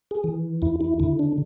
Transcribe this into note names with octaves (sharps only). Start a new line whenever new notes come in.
G#4
E3
E2 E4
E4
D3 E4
D4